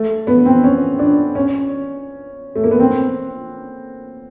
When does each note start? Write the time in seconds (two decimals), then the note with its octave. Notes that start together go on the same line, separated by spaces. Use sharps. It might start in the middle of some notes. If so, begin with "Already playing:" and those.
Already playing: A3
0.27 B3
0.45 C4
0.64 C#4
0.99 D4
1.35 C#4
2.55 A3
2.64 A#3
2.71 B3
2.80 C4